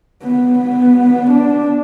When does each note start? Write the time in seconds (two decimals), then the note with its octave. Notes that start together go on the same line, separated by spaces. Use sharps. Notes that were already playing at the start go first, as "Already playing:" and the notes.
0.23 B3
0.59 B3
1.31 D4